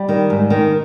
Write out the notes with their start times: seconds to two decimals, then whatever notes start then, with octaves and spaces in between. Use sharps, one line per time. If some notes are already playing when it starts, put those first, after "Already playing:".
Already playing: G3
0.09 D#3
0.30 G#2
0.50 D#3